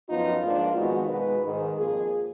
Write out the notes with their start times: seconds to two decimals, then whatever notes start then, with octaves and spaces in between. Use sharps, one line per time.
0.09 F#2 F3 B3 D#4 F4
0.43 G#2 F3 A#3 D4
0.77 F2 D#3 G#3 B3 D#4 F#4
1.10 B2 G#3 D#4 B4
1.44 G#2 D#3 G#3
1.77 F2 F3 A#3 G#4